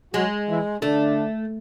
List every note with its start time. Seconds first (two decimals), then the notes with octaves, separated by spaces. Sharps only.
0.13 F#3 G#3 F#4
0.48 E3 E4
0.82 D3 A3 D4